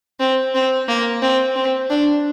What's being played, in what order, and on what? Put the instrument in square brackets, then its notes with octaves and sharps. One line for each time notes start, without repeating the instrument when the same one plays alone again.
[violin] C4
C4
A#3
C4
C4
D4